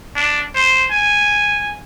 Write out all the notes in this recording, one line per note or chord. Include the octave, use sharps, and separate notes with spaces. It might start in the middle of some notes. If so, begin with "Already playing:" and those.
D4
C5
G#5